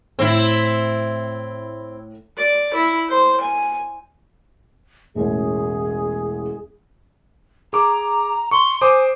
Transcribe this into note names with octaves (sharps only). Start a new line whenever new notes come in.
A2 C4 E4
D5
E4
C5
G#5
E1 A1 C#4 G#4
G#4 A#5 D6
C6 C#6
C5 G#5 D6 D#6